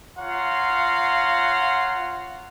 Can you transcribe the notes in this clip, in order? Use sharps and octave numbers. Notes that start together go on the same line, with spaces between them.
F4 C#5 F5 F#5 A#5 C6